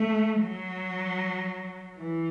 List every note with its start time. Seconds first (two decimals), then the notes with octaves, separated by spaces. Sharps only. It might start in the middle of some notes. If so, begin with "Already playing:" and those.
Already playing: A3
0.41 F#3
1.98 E3